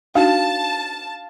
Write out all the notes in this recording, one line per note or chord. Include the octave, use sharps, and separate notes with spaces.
D4 D#4 F#4 F5 A5